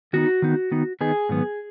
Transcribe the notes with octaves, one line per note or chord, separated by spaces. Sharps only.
D#3 B3 D#4 F#4
D#3 B3 D#4
D#3 B3 D#4
D#3 B3 D#4 G#4
G#2 D#3 F#3 B3